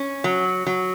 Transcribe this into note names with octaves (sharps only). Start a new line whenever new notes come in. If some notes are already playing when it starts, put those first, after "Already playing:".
Already playing: C#4
F#3
F#3